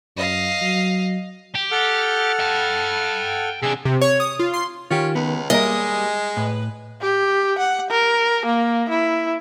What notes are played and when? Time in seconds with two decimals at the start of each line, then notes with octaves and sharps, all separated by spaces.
0.17 F#2 D#5 F5
0.61 F#3
1.55 G4
1.71 A4 F#5 F6
2.39 G5 A5
3.62 C3 D4 G#4 E6
3.85 C3
4.01 C#5
4.20 D#6
4.39 F4
4.54 C6
4.91 D#3 C#4 F4 G4
5.15 C#2 B3
5.50 G3 G#3 A#3 A#4 D#5
6.37 A2 B4
7.01 G4
7.59 F#5
7.91 A#4
8.46 A#3
8.90 E4